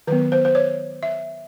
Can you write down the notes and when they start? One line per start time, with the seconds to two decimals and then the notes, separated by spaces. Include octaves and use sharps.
0.07 D#3 F#3 B3 B4
0.32 C5
0.45 C5
0.55 C#5
1.03 E5